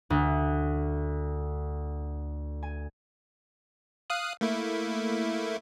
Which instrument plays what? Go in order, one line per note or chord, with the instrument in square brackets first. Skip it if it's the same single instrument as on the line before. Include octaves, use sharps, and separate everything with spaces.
[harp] D2
G#5
[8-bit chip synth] F5 D#6 F#6
A3 A#3 E4